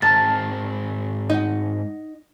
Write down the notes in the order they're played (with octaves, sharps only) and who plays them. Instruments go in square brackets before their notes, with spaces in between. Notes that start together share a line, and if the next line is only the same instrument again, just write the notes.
[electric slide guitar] G#2 C4 A#5 [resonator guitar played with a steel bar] D#3 A#4 A5 [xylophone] A6
[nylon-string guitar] D#4 [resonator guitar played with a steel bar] D#5 F#5